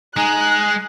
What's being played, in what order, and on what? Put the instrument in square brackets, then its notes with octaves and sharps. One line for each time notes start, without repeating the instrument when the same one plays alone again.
[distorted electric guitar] G#3 [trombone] D#4 [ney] G#5 [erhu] F#6